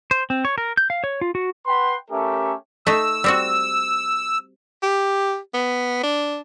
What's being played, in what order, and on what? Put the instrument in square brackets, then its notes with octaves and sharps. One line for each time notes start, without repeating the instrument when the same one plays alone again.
[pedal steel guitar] C5
C4
C#5
A#4
G6
F5
C#5
F4
F#4
[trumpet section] B4 F#5 G5 B5 C6
A3 C#4 G4 A4 A#4 E5
[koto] A3 D#4 [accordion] E6
[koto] G3 C4 F#4
[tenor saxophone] G4
B3
D4